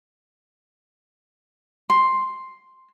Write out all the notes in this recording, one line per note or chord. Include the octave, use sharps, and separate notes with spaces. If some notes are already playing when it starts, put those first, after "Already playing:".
C6